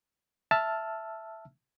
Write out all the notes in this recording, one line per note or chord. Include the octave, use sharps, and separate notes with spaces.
E5 A5 E6 F6